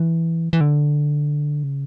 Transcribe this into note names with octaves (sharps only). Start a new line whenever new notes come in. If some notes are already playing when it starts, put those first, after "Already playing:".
Already playing: E3
E3
D3
C#3